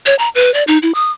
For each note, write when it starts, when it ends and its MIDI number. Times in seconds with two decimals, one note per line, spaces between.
0.06 0.15 73
0.19 0.29 82
0.35 0.53 71
0.54 0.63 74
0.67 0.78 63
0.83 0.92 64
0.95 1.11 87